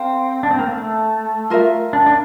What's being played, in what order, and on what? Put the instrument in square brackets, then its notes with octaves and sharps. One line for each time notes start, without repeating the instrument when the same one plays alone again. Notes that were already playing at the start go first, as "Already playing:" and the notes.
Already playing: [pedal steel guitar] C4 [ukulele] A4 F5
[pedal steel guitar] D4
C4
A#3
A3
[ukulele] F4 A#4 E5
[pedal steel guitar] D4
D4